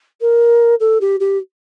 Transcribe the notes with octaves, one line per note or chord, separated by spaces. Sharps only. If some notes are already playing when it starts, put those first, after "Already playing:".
A#4
A4
G4
G4